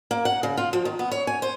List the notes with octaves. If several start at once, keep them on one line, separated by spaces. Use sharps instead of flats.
A#3
F#5
C#3
F4
F3
D#3
B3
C#5
G#5
C5